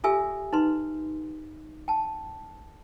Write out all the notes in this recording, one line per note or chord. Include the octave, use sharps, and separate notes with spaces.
F4 G4 A4 E5 G#5 E6
D#4 B4 C6
G5 A5